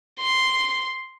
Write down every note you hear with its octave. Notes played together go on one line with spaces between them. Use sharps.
C6